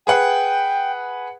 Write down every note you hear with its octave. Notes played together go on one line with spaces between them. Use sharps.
G#4 B4 F#5 G5